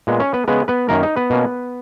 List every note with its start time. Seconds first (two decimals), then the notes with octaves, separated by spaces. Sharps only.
0.07 A#2 G#3 B3
0.20 C#4 C#5
0.34 B3 B4
0.48 C#3 G#3 B3 B4
0.68 B3 B4
0.89 F#2 D#3 A#3 C#4 A#4
1.03 D#4
1.16 B3 B4
1.30 B2 A#3 C#4